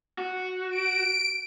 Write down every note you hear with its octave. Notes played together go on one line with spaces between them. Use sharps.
F#4
D7